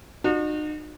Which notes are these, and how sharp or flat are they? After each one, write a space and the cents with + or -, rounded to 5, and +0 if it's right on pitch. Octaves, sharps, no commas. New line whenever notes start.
D#4 -45 F#4 -40